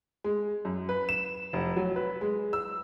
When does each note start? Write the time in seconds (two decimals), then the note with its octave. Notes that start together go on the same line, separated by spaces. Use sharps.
0.24 G#3
0.65 F#2
0.89 B4
1.09 E7
1.53 F1
1.77 F#3
1.96 B4
2.21 G#3
2.53 E6